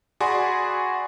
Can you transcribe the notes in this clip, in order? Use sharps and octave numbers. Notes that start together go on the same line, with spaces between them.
F#4 G#4 D5 G#5 B5 C6